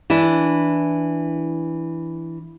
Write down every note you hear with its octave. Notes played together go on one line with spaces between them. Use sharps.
E3 D4 E4